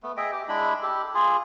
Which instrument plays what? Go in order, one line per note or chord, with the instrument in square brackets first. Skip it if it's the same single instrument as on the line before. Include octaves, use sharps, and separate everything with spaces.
[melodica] A3 B3
G#4 D#5 E5 G5
G4
G#3 D4 E4 B5
G4 A4
F4 G#4